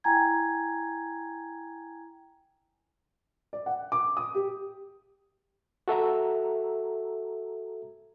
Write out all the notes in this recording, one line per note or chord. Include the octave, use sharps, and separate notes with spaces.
E4 G5 G#5 A#5 G#6
D5
F#5
D6
D#6
G4
F#4 A4 E5 A#5